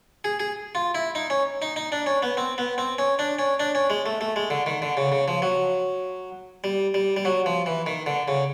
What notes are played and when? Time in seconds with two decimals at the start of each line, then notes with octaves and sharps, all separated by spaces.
0.24 G#4
0.40 G#4
0.75 F4
0.95 E4
1.15 D#4
1.30 C#4
1.62 D#4
1.76 D#4
1.92 D4
2.06 C#4
2.23 B3
2.37 C4
2.58 B3
2.78 C4
2.98 C#4
3.19 D4
3.39 C#4
3.60 D4
3.75 C#4
3.90 G#3
4.06 A3
4.21 A3
4.36 G#3
4.50 D3
4.66 D#3
4.82 D3
4.97 C#3
5.12 C#3
5.28 F3
5.42 F#3
6.64 G3
6.94 G3
7.17 G3
7.25 F#3
7.46 F3
7.66 E3
7.86 D#3
8.06 D3
8.28 C#3